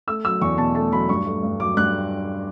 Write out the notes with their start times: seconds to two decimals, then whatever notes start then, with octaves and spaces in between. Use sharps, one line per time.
0.07 A3 E6
0.25 F#3 E6
0.41 E2 C#6
0.58 B2 A5
0.75 A3 A5
0.92 F#3 B5
1.09 G2 C#6
1.26 A3
1.43 G2
1.60 F#3 D6
1.77 G2 F#6